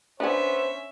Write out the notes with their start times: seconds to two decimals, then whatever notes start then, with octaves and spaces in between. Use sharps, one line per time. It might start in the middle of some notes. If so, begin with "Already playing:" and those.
0.20 B3 C#4 D4 C5 E5 G#5